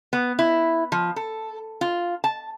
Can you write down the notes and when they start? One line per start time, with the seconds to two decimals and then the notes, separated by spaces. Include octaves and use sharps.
0.13 B3
0.39 E4
0.92 F3
1.16 A4
1.81 F4
2.24 A5